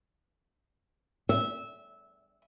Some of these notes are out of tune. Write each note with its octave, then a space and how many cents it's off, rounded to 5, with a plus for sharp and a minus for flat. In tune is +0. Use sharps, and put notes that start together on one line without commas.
E5 -15